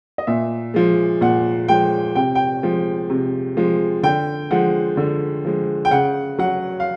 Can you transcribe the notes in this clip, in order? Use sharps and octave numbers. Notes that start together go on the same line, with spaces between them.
D#5
A#2 E5
F3 G#3
A#2 F#5
F3 G#3 G5
C3 G5
G5
F3 G#3
C3
F3 G#3
D3 G5
F3 G#3 F#5
D3
F3 G#3
G5
C#3 F#5
F#3 F#5
F5